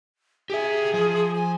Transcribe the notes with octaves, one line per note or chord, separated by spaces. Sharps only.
G4 G#4 E5
F3
G#5